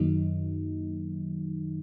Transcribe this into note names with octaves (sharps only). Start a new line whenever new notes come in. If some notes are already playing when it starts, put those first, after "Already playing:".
Already playing: F#2 D#3 F#3 A#3 D#4